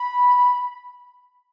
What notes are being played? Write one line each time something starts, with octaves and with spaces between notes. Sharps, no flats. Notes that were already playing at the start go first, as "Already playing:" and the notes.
Already playing: B5